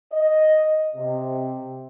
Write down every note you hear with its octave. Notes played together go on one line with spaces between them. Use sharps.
D#5
C3